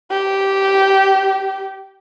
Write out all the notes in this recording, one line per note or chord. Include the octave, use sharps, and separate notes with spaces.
G4